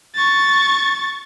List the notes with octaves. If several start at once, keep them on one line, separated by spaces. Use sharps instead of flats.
C#6 A6